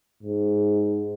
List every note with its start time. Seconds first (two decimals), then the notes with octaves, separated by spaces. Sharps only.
0.23 G#2